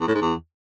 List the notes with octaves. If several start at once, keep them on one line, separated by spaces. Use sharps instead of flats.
E2
A2
G#2
E2